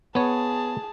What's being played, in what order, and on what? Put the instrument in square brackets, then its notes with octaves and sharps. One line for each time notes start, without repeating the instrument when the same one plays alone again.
[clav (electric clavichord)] B3 C#5 [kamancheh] G#4 A5